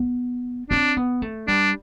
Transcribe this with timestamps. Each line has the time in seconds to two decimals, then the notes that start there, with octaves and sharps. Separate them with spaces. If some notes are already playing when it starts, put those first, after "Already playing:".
Already playing: B3
0.70 C4 D4
0.97 B3
1.22 A3
1.47 G3 D4